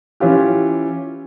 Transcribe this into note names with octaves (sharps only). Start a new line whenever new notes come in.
E3 C#4 F4 G4